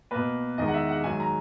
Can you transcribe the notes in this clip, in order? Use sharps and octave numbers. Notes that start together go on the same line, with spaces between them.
B2 A#3 B4
E2 D#3 G#3 D#5
F#5
E5
F#5
G#2 D#3 F#3 G#5
A#5